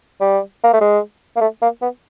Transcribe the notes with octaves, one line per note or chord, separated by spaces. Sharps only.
G3
A#3
A3
G#3
A#3
A3
A#3
B3